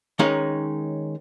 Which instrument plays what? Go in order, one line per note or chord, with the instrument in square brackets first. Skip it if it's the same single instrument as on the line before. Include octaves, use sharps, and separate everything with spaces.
[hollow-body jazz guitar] D#3 G#3 C#4 D#4 C#5